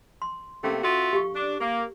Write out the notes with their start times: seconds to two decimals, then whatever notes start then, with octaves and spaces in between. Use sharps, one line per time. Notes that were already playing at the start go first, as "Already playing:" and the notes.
0.22 C6
0.64 C3 A3 A#3 C#4
0.84 F4 F#4 A4 E5
1.13 G4 F5 C#6
1.35 D4
1.61 A#3